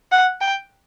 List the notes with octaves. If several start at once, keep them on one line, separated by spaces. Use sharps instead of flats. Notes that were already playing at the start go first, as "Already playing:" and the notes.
F#5
G5